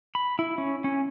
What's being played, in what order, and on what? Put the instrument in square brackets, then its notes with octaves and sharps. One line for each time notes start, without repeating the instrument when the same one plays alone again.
[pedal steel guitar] B5
E4
C#4
C#4